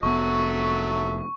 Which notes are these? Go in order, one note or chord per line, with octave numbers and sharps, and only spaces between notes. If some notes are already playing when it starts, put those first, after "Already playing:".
F1 F#3 A3 B3 E5 C#6